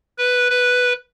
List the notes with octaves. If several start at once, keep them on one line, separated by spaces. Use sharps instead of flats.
B4
B4